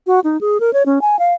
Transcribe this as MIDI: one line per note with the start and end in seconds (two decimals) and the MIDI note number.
0.07 0.20 66
0.24 0.39 63
0.41 0.60 68
0.60 0.73 70
0.73 0.85 73
0.86 1.01 61
1.01 1.19 80
1.19 1.34 77